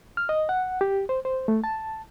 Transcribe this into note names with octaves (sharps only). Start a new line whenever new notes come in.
F6
D#5
F#5
G4
C5
C5
A3
A5